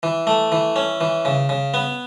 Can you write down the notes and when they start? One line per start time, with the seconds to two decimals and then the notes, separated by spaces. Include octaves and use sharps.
0.03 E3
0.27 A3
0.52 E3
0.76 C#4
1.01 E3
1.25 C#3
1.49 C#3
1.74 B3